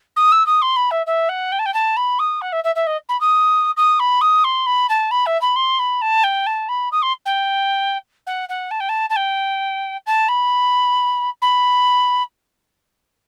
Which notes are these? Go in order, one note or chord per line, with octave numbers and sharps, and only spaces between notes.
D#6
E6
D#6
C6
B5
E5
E5
F#5
G5
A5
G5
A5
B5
D#6
F#5
E5
E5
E5
D#5
B5
D#6
D#6
B5
D#6
C6
B5
A5
B5
E5
B5
C6
B5
A5
G5
A5
B5
D#6
C6
G5
F#5
F#5
A5
G5
A5
A5
G5
A5
B5
B5